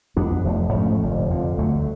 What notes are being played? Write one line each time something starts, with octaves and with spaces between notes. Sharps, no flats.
F2 F3 B3 D4
F1 F2 F3 A3
G#2 F3 A3 C#4
F1 F2 D3
F2 D3 F3
D2 D3 F#3 A3